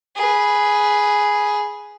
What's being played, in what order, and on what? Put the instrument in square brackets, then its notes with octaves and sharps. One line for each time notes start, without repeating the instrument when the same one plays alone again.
[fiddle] G#4 B4